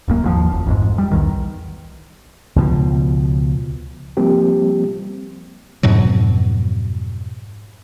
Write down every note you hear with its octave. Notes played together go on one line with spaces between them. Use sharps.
D1 F#2 A#3
G#1 D#2 C#3 F3
F1
A1 F2 G#2
G3
B1 E2 D#3
C#2 B2 F3
F3 G3 A#3 C4 G4
F2 G#2 B2 F#3